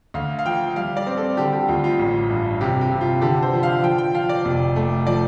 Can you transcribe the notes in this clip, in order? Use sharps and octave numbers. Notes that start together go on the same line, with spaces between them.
D2 F5
F5
F3 G5
G3 F5
D5
C4
A4
D3 G4
G4
D2 F4
F4
A1
G2
C3 G4
G4
C3
F4
D3 G4
C5
F3
F5
F3 G5
G5
F3 F5
D5
F1
A3
F3 D5